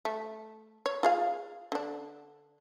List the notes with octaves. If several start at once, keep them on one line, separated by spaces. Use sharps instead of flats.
A3
C#5
F4 G#4 F5
D3 D4